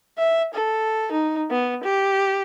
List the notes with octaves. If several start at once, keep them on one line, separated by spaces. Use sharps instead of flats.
E5
A4
D#4
B3
G4